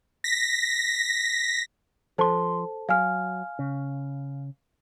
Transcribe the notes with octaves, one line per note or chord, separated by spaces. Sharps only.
A#6 B6
F3 A4 C5 A5 C6
F#3 F5 G#5 F6
C#3